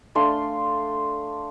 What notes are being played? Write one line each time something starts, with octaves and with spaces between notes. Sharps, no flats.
A3 D4 F5 C6